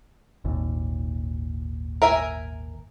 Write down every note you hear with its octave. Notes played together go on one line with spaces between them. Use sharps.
G#1 D#2 A#2
A#4 E5 G#5